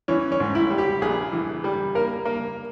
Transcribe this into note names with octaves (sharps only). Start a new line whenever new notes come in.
E3 C#4
C#4
G#2
E4
G3
G4
A#1 G#4
E3
G3
A#3 A#4
A#3